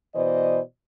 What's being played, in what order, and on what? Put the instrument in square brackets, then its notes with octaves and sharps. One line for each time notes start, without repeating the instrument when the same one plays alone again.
[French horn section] B2 E3 C5 D5 D#5